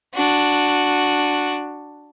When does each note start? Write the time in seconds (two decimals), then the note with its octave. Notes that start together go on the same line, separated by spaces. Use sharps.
0.14 D4 F#4